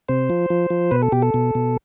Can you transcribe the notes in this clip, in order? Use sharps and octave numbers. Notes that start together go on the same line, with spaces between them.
C3 C5
F3
F3
F3
B2 B4
A4
B2 G4
A4
B2
B2